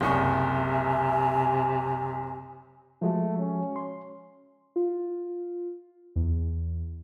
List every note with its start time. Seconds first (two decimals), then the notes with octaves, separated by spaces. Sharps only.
0.01 F#1 C2 C3 E5 G#5 C#6
3.02 F3 G#3 A3 F#4
3.38 C#4
3.76 C6
4.76 F4
6.16 E2